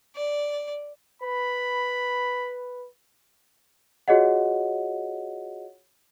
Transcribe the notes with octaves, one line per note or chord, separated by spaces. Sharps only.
D5
B4 B5
F4 F#4 G#4 C#5 D#5 F#5